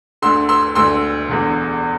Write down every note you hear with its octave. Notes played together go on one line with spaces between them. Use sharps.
D2 D3 C6 E6
C6 E6
D2 D3 C6 E6
E1 E2 D3